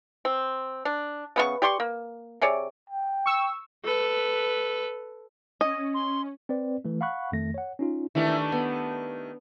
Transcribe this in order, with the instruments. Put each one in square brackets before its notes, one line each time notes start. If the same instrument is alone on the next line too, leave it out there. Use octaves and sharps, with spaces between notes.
[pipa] C4
D4
C#3 B3 F4 C#6
G4 D5 C6 C#6
A#3
C3 G#4 C#5 D5
[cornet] G5
[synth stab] C#6 E6
[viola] A4 B4
[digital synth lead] C#4 [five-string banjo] D#5
[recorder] C6
[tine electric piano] C4 B4 D5
E3 A3
F5 F#5 B5 C#6 F#6
F2 D#3 A3 A#6
C#5 F#5
C#4 D#4 F4
[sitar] D#3 A3 G4 [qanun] E3 D4 B5
[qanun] D4
B3